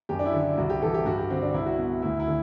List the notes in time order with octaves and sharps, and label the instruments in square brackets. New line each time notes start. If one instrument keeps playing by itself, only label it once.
[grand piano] F#2 G4
D4
E4
D3
E4
C2 F#4
G4
C3 E3 A4
G4
G2 F#4
G4
D3 C4
D4
C2 E4
F#4
B2
D2 E4
E4
D3